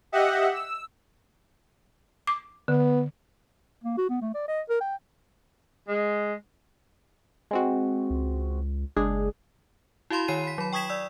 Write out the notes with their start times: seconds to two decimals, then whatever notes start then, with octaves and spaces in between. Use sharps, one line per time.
0.12 G4 D#5 E5 F#5
0.53 E6
2.27 D6
2.68 D3 B3
3.84 A#3
3.98 F#4
4.09 B3
4.21 A3
4.34 D5
4.48 D#5
4.69 A#4
4.81 G5
5.88 G#3
7.51 G#3 C4 F#4
8.10 C#2
8.96 F#1 G#3 D4 G#4
10.10 E4 F#4 F5 B5 C6
10.28 D#3 C#5 G#5 C7 D#7
10.44 B5 B6
10.58 F#3 B5
10.73 G5 C#6 D#6 G#6 B6 E7
10.90 D5 E6